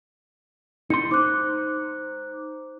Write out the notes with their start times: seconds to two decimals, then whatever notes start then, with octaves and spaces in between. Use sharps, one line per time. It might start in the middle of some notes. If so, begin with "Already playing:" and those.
0.90 D#4 C6 C#7
1.11 D#4 C5 D6 F#6